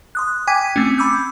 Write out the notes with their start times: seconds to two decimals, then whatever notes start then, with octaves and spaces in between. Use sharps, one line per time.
0.15 C6 D#6 F#6
0.47 G5 G#5 D6 G#6 B6 D#7
0.76 A3 C4 C#4
0.98 B5 D6 E6 G6